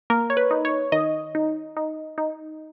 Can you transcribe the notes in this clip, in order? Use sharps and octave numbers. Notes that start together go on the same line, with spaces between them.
A#3 A#4
C#5
B4
D#4
C#5
D#3 D#5
D#4
D#4
D#4